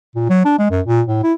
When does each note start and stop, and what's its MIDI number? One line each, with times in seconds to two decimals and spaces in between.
0.16 0.26 46
0.30 0.43 54
0.45 0.57 62
0.59 0.70 56
0.71 0.81 42
0.86 1.02 46
1.07 1.22 45
1.24 1.33 64